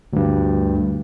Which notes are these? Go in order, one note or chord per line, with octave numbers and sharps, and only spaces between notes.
D2 G2